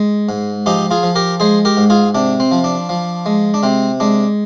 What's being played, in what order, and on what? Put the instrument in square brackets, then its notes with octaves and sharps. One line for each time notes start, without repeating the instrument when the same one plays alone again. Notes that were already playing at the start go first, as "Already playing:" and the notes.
Already playing: [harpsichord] G#3
G#2
F3 D#4 G4
F4 G#4
F3
G4 A#4
G#3 G#4 C5
G4 A#4
G#2
F4 G#4
C3 D4
C4
F3
D4
F3
G#3
D4
C3 C4
G#3 D4